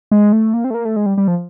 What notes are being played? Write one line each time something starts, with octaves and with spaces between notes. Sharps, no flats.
G#3
A3
A#3
C4
A3
A#3
A3
G#3
G3
G3
F3